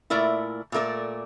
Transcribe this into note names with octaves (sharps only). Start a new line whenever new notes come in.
A#2 A3 E4 A#4 D5
A#2 A3 E4 A#4 D5